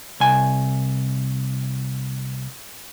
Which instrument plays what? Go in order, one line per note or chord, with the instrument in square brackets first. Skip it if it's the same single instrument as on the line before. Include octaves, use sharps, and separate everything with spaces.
[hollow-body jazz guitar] C2 G#5